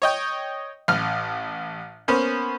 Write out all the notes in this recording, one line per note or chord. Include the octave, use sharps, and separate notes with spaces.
C#5 D#5 G5
A1 F6
A#3 B3 C#4 C5